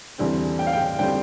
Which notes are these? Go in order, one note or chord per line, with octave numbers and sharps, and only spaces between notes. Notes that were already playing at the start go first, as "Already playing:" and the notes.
E2 D3 G3 C4
G5
F5
G5
D3 G3 C4 G5